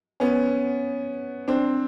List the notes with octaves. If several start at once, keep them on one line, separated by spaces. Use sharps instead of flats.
B3 C#4
C4 D4